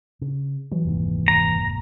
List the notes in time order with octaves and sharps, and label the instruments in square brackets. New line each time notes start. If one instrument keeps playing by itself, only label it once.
[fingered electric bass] C#3
[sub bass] E3 [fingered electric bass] F#3
[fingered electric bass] F1 D#2 G#2
[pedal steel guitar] A#5